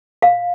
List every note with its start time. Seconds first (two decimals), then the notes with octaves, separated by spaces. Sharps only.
0.22 F5